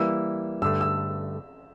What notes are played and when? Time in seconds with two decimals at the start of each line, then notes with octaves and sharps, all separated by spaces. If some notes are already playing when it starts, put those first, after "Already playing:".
Already playing: E3 G3 A#3 E4 E6
0.62 G2 D3 A3 E6
0.81 E6